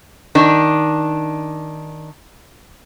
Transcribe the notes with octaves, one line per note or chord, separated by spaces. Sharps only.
D#3 D4